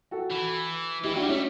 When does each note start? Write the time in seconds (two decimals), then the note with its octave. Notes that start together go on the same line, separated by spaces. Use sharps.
0.11 F#4 A4
0.30 E3
1.04 E3 E4 G4
1.13 F#3 D4 F#4
1.22 G3
1.28 C#4 E4
1.32 A3